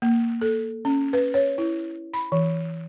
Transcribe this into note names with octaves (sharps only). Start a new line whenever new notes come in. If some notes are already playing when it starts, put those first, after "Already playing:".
A#3
A4
C#4
B4
C#5
E4
B5
E3